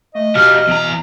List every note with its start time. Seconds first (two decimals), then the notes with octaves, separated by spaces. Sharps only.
0.15 A3 D#5
0.36 B2 F3 G4 F6
0.68 E2 A#5